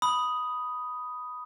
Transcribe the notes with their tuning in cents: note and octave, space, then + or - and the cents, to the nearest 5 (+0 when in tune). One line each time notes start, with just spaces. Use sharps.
B5 +0 D#6 +0